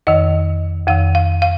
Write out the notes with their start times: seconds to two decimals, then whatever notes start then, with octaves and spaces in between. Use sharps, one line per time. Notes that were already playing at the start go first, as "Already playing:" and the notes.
0.07 F2 D#3 D#5
0.87 F2 D#3 F5
1.15 F5
1.42 F5